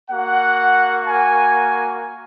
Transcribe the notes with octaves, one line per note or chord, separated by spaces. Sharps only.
A#3 F#4 F#5
G#5